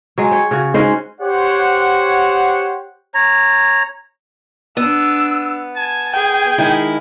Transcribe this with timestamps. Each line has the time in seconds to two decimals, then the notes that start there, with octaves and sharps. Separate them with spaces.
0.18 F#3 G#3
0.31 C#5 G5
0.51 C#3 F#4
0.74 G#3 C#4 D#4 F#4 C5
1.21 G4 C5 C#5 F#5
3.14 C#5 A#5
4.77 B3 D4 E6
5.77 G#5 A5
6.14 G#4 G5
6.58 D#3 G#3 E4